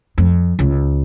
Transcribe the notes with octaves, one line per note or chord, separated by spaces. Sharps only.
F2
C#2